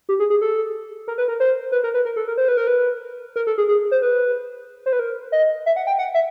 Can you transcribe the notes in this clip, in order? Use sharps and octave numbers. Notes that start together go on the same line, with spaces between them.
G4
G#4
G#4
A4
A#4
B4
A#4
C5
B4
A#4
B4
A#4
A4
A#4
C5
B4
A#4
B4
A#4
A4
G#4
G#4
C5
B4
C5
B4
A#4
D#5
E5
F#5
G5
F#5
E5